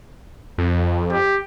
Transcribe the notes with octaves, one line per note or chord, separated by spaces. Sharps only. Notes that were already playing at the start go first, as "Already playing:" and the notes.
F2
G4